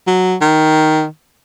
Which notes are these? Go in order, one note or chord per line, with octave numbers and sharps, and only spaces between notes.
F#3
D#3